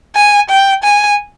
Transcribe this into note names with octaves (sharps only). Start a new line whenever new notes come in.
G#5
G5
G#5